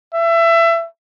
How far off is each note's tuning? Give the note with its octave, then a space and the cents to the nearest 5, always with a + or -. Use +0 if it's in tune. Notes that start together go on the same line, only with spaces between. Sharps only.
E5 +25